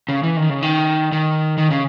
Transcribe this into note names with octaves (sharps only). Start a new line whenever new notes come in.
C#3
E3
D#3
C#3
D#3
D#3
D#3
C#3